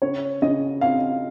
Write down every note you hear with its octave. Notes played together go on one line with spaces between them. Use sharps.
C#3 C#5
C#3 D#5
C4 F5